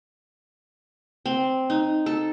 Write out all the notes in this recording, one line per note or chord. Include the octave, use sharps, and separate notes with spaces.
C4
D#4
A4